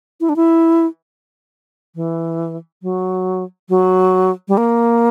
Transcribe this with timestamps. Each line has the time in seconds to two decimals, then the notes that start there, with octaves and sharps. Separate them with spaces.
0.21 E4
0.29 D4
0.36 E4
1.95 E3
2.82 F#3
3.69 F#3
4.48 G3
4.57 A#3